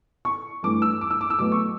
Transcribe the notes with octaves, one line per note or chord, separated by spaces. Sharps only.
C#6
G2 E3 A3 D6
E6
D6
E6
D6
E6
B2 F#3 A3 D6
C#6